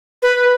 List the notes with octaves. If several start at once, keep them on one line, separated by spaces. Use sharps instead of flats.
B4